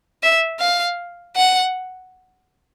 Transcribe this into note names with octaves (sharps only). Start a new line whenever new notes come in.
E5
F5
F#5